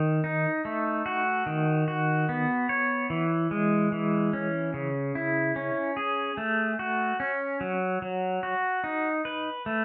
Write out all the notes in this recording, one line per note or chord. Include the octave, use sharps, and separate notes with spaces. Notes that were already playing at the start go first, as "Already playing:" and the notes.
Already playing: D#3
D#4
A3
F#4
D#3
F#4
B3
C#5
E3
G#3
E3
C#4
C#3
E4
C#4
G#4
A3
F#4
C#4
F#3
F#3
F#4
D#4
B4
A3